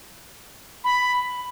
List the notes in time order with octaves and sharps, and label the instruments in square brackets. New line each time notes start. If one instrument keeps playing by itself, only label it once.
[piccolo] B5